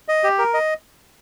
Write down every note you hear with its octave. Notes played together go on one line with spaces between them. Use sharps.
D#5
G4
A#4
D#5